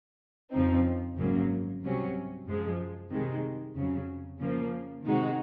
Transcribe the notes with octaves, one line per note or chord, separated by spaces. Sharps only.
F2 C#3 F3 C4 D#4
G#1 F#2 C#3 F#3 A#3
C2 C3 F#3 C#4
F#2 F3 G#3
C2 C3 D#3 G#3
F2 C#3 F#3
C#3 F3 A#3
C3 D#3 G#3 D#4 F#4